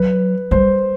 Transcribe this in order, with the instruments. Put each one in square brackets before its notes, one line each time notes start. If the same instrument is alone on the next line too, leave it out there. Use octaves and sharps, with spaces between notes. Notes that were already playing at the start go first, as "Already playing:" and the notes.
Already playing: [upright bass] F#3 [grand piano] B4
[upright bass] G3 [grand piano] C5